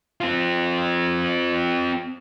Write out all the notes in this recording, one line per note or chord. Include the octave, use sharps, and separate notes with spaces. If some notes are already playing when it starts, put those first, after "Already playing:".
C4 F4